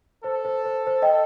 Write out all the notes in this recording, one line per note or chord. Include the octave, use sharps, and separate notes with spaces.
A4 C5
C5
C5
C5
D#5 G5